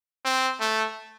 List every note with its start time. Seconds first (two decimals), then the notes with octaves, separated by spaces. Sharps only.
0.25 C4
0.61 A3